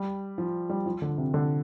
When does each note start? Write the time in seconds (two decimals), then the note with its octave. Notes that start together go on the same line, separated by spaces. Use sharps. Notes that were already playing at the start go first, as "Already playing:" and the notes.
Already playing: G3
0.38 F3
0.70 G3
0.86 F3
1.02 D3
1.18 C3
1.34 D3